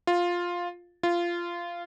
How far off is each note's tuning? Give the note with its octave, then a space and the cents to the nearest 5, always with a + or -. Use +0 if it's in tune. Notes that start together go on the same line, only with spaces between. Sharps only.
F4 +5
F4 -15